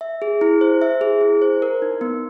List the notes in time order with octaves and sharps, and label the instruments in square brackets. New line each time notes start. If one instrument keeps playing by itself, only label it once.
[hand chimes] E5
G#4
E4
C5
E5
G#4
E4
C5
A#4
D#4
B3